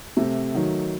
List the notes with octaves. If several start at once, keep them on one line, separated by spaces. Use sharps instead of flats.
C3 A3
D#3 F#3